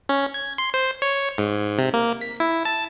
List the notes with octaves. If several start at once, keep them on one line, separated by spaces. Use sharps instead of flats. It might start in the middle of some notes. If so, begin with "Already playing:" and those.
C#4
G#6
C6
C5
C#5
G#2
C3
A#3
B6
E4
A5